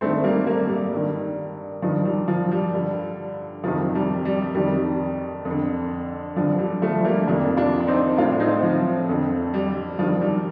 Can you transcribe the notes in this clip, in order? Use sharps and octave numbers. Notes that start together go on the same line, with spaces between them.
G2 D#3 A3 C4
G3 A#3
G3 A#3
G3
G2 D#3
G2 D#3 F3
G3
F3
G3
G2 D3
F2 C3 D#3 F3
G3
G3
F2 D#3 G3
F2 D3
G2 D3 F3
G3
F3 A3
G3 A#3
F2 C3 D#3 A#3 D4
D4 F4
D4
C4 D#4
A2 D4 F4
C4 D#4
F3
F2 D3
G3
G2 D#3 F3
G3